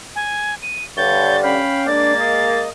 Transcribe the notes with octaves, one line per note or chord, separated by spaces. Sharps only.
G#5
D#7
G2 D3 C#5 G6 A6
C#4 F5 G5 B5
G#3 A#3 D4 D5 A6
D#5